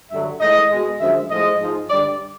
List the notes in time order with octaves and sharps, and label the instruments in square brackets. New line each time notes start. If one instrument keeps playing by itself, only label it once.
[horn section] G2 D3 F#3 E5
A2 E3 G#3 D#5
B2 G#3
F#2 D3 F3 G#3 E5
A2 F3 G#3 D#5
G#2 F3 G#3
G2 D3 G3 D5